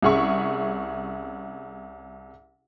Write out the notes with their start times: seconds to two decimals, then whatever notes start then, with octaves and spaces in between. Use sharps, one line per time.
0.02 C2 C#4 G#4 E5 C#6